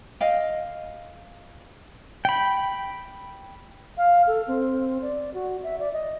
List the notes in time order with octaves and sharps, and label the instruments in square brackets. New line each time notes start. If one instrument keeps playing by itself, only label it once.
[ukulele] D#5 F5 G5
[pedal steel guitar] G5 B5
[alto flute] F5
A4
C4
D5
F#4
E5
D5
D#5